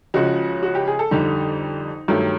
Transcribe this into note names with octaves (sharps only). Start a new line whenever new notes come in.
C#2 C#3 F3 F#4
F#4
G4
G#4
A4
F2 D3 G3 D#4
G2 D#3 F#3 A3